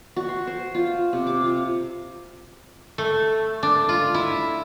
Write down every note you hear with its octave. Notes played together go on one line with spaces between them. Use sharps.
F#4
C6
C5
F4
C3
D6
F4
A3
D4
F4
E4